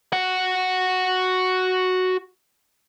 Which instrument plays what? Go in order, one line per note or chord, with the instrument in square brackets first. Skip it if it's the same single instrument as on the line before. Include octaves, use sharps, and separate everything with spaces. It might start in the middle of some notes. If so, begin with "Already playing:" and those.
[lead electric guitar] F#4 F#5